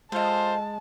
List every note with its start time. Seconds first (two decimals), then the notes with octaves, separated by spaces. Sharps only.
0.12 G#3 F4 A4 C5 D#5 A5